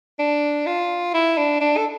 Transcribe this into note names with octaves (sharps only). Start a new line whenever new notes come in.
D4
F4
E4
D4
D4
A4